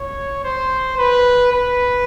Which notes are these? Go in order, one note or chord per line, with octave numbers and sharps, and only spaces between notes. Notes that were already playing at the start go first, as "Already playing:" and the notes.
Already playing: C#5
C5
B4
B4